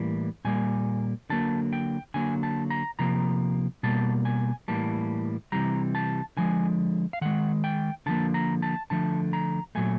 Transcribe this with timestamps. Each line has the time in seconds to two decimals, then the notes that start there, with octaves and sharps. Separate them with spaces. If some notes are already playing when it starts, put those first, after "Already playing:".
Already playing: A2 E3 G3 A#3
0.45 A#2 G3 A#3 G#5
1.30 D3 F#3 A#3 A5
1.73 G5
2.14 D3 F#3 A#3 G#5
2.43 A5
2.70 A#5
2.99 C3 F3 A#3 A#5
3.83 B2 G3 A#3 A5
4.25 G#5
4.68 A2 E3 G3 A#3 A5
5.52 C3 E3 G3 A#5
5.95 A5
6.37 D3 F3 G#3 G#5
7.13 F5
7.21 D#3 G#3 F#5
7.64 G5
8.06 D3 F3 A#3 A5
8.34 A#5
8.62 A5
8.90 D3 F3 A3 A5
9.33 A#5
9.75 A#2 F#3 A3 G#5